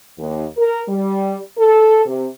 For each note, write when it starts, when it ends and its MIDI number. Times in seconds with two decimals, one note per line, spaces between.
0.19 0.45 39
0.57 0.81 70
0.87 1.38 55
1.57 2.04 69
2.05 2.27 48